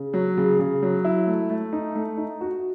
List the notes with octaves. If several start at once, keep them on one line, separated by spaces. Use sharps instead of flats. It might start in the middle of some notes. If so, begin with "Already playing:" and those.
Already playing: C#3
F#3
C#3
C#3
F#3
E4
A3
A3
D#4
A3
D#4
F#4